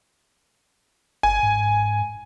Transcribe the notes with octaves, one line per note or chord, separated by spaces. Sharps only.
G1 G#5
G#2